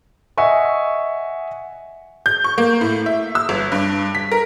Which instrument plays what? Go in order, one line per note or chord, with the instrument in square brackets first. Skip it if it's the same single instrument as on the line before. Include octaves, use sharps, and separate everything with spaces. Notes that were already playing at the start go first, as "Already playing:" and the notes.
[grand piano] D#5 E5 F#5 G#5 C#6
[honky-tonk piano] G6
C#6
A#3
A2
E5
E6
G1
G2
B6
A#4